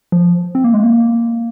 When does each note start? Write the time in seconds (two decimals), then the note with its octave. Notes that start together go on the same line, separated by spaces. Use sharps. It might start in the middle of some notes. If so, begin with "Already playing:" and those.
0.12 F3
0.55 C4
0.64 A#3
0.74 G#3
0.83 A#3